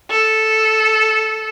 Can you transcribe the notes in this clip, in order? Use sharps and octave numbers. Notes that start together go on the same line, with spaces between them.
A4